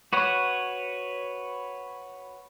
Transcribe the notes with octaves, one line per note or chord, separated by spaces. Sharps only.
F#4 B4 C#5 F#5